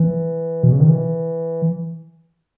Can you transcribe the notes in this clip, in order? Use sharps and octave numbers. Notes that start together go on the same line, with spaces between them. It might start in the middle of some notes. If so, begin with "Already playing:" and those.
Already playing: E3
B2
C#3
D#3
E3